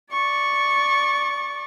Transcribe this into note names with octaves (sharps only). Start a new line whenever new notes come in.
D5 C#6